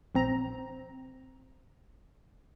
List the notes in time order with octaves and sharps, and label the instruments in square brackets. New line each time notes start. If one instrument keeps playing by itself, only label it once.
[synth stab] A#1 C4 A#5